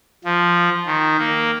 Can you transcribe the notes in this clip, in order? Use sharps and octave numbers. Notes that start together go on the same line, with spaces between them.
F3
D#3
A#3